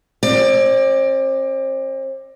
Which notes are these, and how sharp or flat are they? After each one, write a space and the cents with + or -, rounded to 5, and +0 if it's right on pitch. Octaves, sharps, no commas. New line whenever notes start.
C4 +40 D5 +15